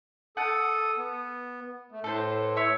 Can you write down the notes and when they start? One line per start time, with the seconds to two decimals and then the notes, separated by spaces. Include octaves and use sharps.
0.37 A4 F#5 A5 D#6
0.97 B3
1.92 A3
2.04 A2 A4 B4 C5
2.56 C#5 E5 C#6